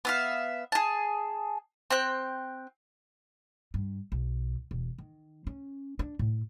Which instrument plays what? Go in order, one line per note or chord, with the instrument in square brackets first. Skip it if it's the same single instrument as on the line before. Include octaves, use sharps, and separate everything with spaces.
[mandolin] B3 E5 F5
G#4 A5
C4 G5 F#6
[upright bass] G2
B1
E1
D#3
C#4
D4
A2